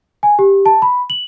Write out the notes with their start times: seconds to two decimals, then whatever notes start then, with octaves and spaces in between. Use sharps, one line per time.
0.23 G#5
0.39 G4
0.66 A5
0.82 B5
1.10 F#7